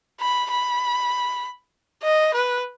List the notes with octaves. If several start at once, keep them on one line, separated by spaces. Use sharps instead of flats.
B5
B5
D#5
B4